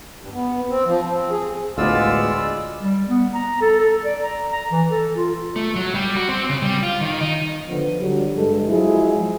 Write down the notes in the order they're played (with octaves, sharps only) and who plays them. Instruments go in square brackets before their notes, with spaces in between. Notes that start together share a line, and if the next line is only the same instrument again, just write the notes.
[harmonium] G2
B3
C4
F3
C4
G#4
[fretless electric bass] D2 A2 [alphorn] G#3 [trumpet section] B3 F4 [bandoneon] D5 E6
[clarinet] G3
B3
A#5
A4
A4
D5
A#5
A#5
E3
A4
F4
[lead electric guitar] A3
F#3
G3
F#4
C4
C#3
G3
F4
D#3
D#4
[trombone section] D3 F3 B3
D3 F#3 G3
G2 G#3 A4
F3 F#3 G#3 E4 G#4